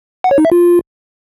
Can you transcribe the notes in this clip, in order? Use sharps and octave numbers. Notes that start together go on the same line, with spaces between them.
F#5
C#5
D#4
E5
F4